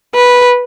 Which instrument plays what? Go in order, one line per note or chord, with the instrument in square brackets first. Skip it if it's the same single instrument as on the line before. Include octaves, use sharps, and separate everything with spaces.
[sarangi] B4